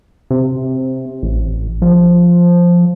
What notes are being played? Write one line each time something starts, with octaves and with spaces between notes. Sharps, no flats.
C3
A1
F3